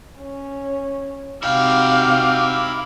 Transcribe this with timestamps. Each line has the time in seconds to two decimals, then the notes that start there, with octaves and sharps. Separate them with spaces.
0.20 C#4
1.43 C3 D#4 E4 F#4 F5 G5 D6 G6